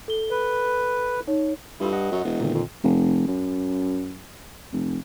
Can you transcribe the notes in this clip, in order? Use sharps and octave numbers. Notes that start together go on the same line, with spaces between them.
A4 G7
B4
D#4 C#5
G2 E4 F4 A4
D#5 F#5
F#2
E1
A#2 D3 D#3
F2
F1
F#2
F1